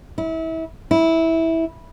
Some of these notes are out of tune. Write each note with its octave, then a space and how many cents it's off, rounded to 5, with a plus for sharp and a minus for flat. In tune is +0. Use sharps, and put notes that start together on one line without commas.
E4 -30
E4 -15